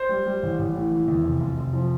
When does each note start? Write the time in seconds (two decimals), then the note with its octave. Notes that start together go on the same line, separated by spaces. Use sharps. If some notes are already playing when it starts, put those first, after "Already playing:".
Already playing: C5
0.09 G3
0.26 G3
0.43 A1
0.59 A1
0.75 A2
0.91 E3
1.08 E2
1.24 F1
1.40 F1
1.57 F1
1.73 F3